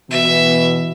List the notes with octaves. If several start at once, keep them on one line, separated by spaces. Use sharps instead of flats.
B2 E3 E5